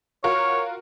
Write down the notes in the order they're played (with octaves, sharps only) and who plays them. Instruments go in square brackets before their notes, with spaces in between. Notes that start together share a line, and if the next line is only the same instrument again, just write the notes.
[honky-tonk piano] F4 F#4 A#4 [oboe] C#5